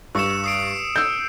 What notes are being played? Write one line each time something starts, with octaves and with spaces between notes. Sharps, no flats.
G2 C#6 E6 C#7 E7
D#6 C7 D7
E6 G6